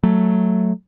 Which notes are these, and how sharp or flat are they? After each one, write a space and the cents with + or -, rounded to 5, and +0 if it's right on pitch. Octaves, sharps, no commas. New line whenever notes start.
F#3 +0 A3 +0